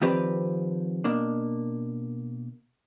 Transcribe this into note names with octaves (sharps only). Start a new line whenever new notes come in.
D#3 F3 C4 G4 B4 D5
B2 A#3 D4